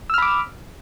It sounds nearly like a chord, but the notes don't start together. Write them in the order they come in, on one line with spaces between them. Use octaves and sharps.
E6 F6 B5 D6